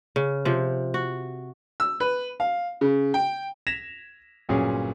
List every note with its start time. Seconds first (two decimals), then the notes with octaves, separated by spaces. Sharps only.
0.16 C#3
0.45 C3 F3
0.94 F#4
1.80 E6
2.00 B4
2.40 F5
2.81 C#3
3.14 G5
3.67 G#6 A#6 B6 E7 F7
4.49 G1 A#2 F#3 C#4 G#4 C#5